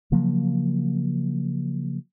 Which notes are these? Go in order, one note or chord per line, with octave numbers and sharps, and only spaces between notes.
C#3 F3 F#3 A#3